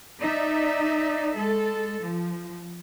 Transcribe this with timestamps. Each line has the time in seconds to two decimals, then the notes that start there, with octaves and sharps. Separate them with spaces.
0.23 D#4 D5 E5
1.36 G#3 A4
2.02 F3